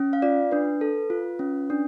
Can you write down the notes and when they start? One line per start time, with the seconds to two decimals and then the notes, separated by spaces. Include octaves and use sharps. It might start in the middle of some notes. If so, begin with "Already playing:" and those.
Already playing: C#4
0.13 F5
0.22 F4 D5
0.52 D4 B4
0.81 A4
1.10 F4
1.39 C#4
1.70 D4